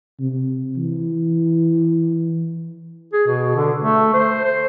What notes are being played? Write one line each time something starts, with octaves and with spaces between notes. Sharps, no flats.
C3
E3
G#4
B2
D3
A3
C5
C5